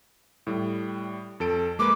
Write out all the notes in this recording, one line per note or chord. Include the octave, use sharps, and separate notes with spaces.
A2 G3
F2 A4 D7
G#3 A#3 B4 D6